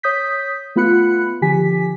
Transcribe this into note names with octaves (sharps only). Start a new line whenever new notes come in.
C#5 D#6 G6 B6
A3 B3 F4 B5 F#6 C#7
D3 F3 G4 G#5 B6